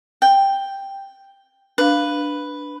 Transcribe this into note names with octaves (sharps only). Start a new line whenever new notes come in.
G5
D4 B4 F5